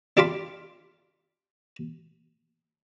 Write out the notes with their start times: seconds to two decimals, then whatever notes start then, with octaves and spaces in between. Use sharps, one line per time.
0.17 D4 G4 F5 B5 C6